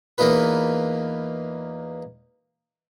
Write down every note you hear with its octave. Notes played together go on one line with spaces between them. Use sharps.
E2 A#3 D#4 F4 B4